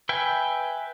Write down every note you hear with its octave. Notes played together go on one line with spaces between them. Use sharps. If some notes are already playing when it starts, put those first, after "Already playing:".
B4 E5 G5 G#5